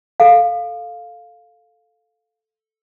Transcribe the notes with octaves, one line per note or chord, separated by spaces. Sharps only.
A4 F5